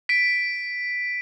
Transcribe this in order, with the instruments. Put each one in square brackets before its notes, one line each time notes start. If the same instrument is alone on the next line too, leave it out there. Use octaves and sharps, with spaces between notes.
[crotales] B6 D7